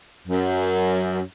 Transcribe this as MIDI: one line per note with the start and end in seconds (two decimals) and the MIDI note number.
0.27 1.22 42